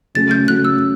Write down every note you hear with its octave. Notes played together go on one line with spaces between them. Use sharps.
C#3 F#3 A3 C#4 A6
G6
C#3 F#3 A3 C#4 F#6
E6